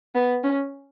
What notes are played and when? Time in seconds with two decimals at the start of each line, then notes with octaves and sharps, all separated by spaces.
0.15 B3
0.44 C#4